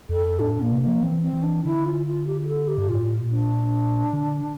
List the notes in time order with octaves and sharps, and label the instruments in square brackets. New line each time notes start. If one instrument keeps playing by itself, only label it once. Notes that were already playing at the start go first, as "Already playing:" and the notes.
[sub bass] F2 [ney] A4
[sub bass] A2 [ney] D4
[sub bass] A#2
[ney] A#3
[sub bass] C3
[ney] A#3
[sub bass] F3
[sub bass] E3 [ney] C4
[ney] C4
[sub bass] E3
[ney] D4
[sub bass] D3 [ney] E4
[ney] F4
F4
G4
G4
A4
G4
[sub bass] G2
[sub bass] A2 [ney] F4
[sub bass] A#2
[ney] D4
[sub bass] D3